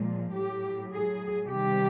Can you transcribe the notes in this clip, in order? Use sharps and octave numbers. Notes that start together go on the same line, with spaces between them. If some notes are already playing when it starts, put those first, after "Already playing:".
Already playing: A#2 F3 G#3
A2 F#3 G4
G#4
C3 D#3 G3 G4